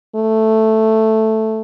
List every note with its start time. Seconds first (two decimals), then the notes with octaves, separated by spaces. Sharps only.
0.16 A3